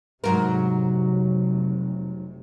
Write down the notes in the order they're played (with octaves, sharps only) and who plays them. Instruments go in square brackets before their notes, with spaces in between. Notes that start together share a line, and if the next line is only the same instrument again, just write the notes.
[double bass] F1 C3 [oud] G#2 F#3 A#4